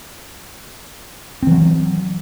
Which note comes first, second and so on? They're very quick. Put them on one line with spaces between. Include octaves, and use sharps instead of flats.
C4 E3 F#3